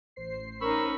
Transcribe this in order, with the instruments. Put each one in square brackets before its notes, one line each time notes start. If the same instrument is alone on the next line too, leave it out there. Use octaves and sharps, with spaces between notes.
[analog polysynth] A1 C5 C7
[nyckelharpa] C#4 D#4 [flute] A#4 [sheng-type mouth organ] B5 C#6 E6